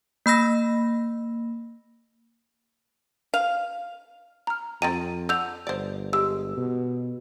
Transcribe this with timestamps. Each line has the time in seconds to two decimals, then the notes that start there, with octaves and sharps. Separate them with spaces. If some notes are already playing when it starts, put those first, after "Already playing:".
0.26 A#3 B5 E6 A#6
3.34 F5
4.47 A#5 F6
4.82 F2 C4 G5 A#5 A6 D#7
5.29 D3 E6 G6 F7
5.67 G1 C5 D5
6.13 G#3 G4 E6
6.57 B2